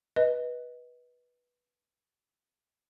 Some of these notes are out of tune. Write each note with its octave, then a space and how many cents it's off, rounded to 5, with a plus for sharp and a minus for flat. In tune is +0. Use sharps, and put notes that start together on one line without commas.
B4 -15 D#5 +15